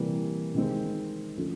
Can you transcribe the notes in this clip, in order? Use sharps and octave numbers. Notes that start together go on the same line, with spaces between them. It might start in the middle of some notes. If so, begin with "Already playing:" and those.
Already playing: C3 E3 G3 A#3
C3 D#3 G#3 C4
D3 F3 A3 C#4